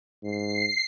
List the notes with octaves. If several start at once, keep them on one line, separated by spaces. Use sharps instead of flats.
G#2 C7